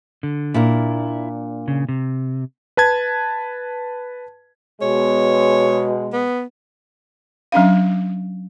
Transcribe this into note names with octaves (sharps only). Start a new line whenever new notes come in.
D3
A#2 D4 E4 A#4
C#3
C3
B4 A5 G#6
B2 G#3 C#5
B3
F#3 C#4 D4 F5